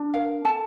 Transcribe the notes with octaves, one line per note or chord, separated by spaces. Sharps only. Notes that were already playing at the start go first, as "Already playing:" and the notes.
Already playing: D4
A#4 F5
A4 A5